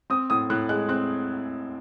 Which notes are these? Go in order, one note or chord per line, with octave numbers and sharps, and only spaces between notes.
C4 D#6
A2 D#6
A2 F#6
G#3 F#6
C4 F#6